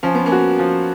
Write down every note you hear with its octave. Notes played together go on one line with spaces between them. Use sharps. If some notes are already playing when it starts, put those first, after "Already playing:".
F3 C#4
B3
A#3 C#4
F#4
F3